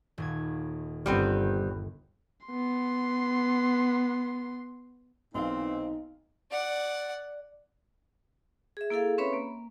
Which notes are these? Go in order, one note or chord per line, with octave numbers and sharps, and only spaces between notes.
D#1 D#2 G#6
G1 G3 B3 C4
B3 C6
B1 A#2 E3 C4 D#4 F5
D5 F#5
G#4 E5
A#3 E4 G#4 A4 F5
C4 C#4 B4 C#5 E5 B5
A#3